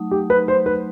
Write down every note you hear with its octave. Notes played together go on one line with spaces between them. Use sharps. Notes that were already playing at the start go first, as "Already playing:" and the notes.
Already playing: F#3 A3 D#4
G4
B4
C5
B4